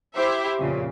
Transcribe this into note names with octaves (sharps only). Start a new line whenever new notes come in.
E4 G4 C5 E5
F2 A#2 C#3